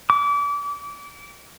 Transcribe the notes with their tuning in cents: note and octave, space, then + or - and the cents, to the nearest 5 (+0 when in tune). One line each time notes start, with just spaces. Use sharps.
D6 -35